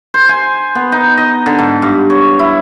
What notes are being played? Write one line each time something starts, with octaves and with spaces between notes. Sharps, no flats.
C5
G#5
B3
D#4
D#5
D3
G#2
G2
C#5
E4